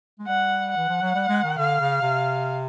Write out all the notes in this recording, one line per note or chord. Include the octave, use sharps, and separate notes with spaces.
G#3
G3 F#5
F#5
E3
F3
F#3
G3
G#3
D#3
D3 F5
C#3
C3